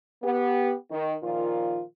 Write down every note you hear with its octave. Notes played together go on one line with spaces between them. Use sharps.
B3 G4
D#3
A#2 D#3 F3 F4